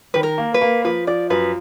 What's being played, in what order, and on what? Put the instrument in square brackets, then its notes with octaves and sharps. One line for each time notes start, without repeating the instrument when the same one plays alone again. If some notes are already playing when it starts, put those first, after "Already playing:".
[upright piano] D#3 [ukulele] B4
[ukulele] A#4
[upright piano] A#3
[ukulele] B4
[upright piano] A#3
[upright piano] F3 [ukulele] B4
[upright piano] F3 [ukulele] D5
[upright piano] F#2 [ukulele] B4